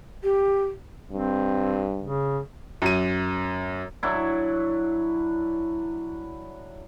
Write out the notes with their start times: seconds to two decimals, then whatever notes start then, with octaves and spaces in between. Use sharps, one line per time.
0.23 G4
1.12 G2 C4
2.02 C#3
2.82 F#2 D#7
4.03 F#3 D4 E4